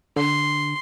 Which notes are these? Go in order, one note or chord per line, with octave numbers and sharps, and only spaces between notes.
D3 C6